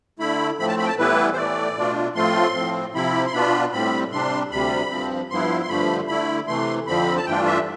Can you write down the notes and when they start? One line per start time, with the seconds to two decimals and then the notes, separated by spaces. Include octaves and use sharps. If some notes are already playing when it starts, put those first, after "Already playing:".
0.19 D3 A3 E4 B5
0.58 A2 F3 A3 C4 B5
0.68 A5
0.78 B5
0.83 G5
0.88 A5
0.98 A2 E3 G3 B3 E4 B4
1.33 C5
1.37 A2 E3 A3 D5
1.77 B2 A3 D4 F4
2.15 A2 F3 A3 C4 F4 C6
2.55 A2 F3 C4
2.94 C3 F3 C4 E4 B5
3.26 C6
3.33 B2 B3 D4 F4 B5
3.72 A2 G3 C4 B5
4.12 C3 G3 D4 C6
4.51 D2 C3 G3 B5
4.90 G2 F3 C4
5.30 G2 F3 B3 E4 C6
5.62 C6
5.69 G2 D3 F3 A3 B5
6.08 D3 A3 E4 B5
6.48 C3 E3 A3 C6
6.87 F2 D3 F3 C4 B5
7.18 A5
7.27 G2 E3 A3 D4 F4 G5
7.46 E5